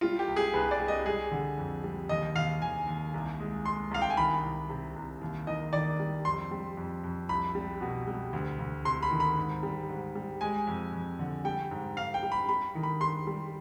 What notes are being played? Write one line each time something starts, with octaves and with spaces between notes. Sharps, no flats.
G3 F4
G4
C2
G#4
C2 B4
D5
G3
D#5
G3 G#4
D3
F2
G3
D#2 D#5
D#2 F5
D#2 G#5
D#2
C2
G#3
G#3 C6
C2 F5
G5
G#5
D#3 B5
C2
C3
C2
D#2
D#3 D#5
D#3 D5
G3
F2 C6
G3
F2
F2
C2 B5
G3
B2
G3
D2
D2
C3 C6
B5
D#3
B5
G#2
G3
G#2
G3
G#3 G#5
F2
F2
D3
G3 G5
G#2
G#2 F5
G5
G3
B5
G3 B5
D#3
B5
G3 C6
G3